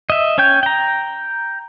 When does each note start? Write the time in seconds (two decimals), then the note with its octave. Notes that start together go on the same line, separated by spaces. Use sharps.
0.10 D#5 E5
0.38 C#4 C#5 G5 G6
0.63 G5 A#5